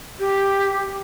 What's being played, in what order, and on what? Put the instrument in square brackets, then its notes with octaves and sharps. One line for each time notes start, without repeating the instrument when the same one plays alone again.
[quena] G4